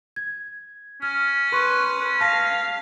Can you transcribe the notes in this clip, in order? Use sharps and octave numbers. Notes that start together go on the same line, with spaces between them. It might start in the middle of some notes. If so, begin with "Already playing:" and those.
G#6
C#4 F6
B4 C6 C#6
F5 A5 A#6 B6